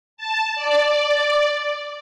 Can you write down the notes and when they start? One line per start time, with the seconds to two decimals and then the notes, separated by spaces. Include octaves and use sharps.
0.17 A5
0.55 D5